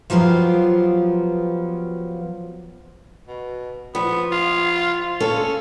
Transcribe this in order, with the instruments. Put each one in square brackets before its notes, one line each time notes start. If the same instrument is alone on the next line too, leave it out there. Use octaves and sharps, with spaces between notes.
[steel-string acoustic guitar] F3 F#3 B3 F4 G4
[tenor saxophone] B2
[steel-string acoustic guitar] F3 [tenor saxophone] B3
[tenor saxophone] F4
[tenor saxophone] C#4 [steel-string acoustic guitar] A4 F5